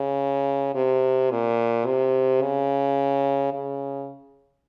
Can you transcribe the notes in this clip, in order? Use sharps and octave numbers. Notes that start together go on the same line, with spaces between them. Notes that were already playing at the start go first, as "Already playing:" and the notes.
Already playing: C#3
C3
A#2
C3
C#3
C#3